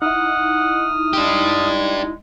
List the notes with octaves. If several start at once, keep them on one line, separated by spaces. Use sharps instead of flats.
D#4 E4 F#5 D#6 F6
G#3 D4 G4